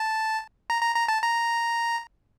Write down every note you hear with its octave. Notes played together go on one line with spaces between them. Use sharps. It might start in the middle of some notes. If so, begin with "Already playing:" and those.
Already playing: A5
A#5
A#5
A#5
A5
A#5